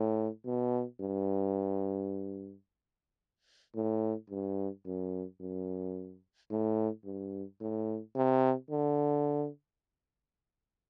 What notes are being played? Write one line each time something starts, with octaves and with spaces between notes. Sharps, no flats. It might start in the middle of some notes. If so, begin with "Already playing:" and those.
Already playing: A2
B2
G2
A2
G2
F#2
F#2
A2
G2
A2
C3
D3